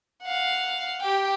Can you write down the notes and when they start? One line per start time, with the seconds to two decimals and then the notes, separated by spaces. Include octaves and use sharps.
0.23 F5 F#5
1.01 G4 G5